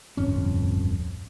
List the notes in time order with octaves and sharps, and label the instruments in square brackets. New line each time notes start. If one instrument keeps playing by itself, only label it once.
[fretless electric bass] D1 G1 F2 C#4